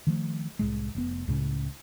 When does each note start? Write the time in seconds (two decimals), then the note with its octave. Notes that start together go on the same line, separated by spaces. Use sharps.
0.07 D#3 F3 A3
0.59 C2 A2 G#3
0.95 F1 B3
1.28 C#2 A2 C#3